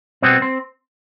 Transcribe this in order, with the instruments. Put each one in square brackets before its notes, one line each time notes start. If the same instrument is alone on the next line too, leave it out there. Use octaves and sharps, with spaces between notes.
[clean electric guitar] B2 G3 B3 C4
C4